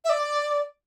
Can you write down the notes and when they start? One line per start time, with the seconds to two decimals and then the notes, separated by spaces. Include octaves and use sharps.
0.05 E5
0.10 D5